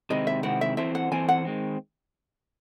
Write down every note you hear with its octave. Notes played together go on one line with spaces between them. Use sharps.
C3 D#3 G#3 C4 E4 D#5
E5
C3 D#3 G#3 C4 E4 F#5
E5
E3 C4 E4 A4 C5 E5
F#5
E3 C4 E4 A4 C5 G#5
F#5
D#3 G#3 C4